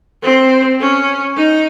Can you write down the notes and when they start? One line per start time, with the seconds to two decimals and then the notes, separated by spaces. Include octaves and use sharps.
0.23 C4
0.80 C#4
1.37 D#4